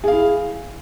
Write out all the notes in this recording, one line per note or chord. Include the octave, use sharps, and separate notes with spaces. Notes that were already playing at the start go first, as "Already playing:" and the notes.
E4 G#4 F5